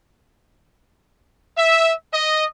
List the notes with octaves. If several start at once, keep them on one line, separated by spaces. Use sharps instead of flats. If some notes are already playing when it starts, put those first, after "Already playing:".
E5
D#5